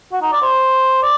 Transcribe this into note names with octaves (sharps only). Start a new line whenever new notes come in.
F#4
D#4
D5
C5
D5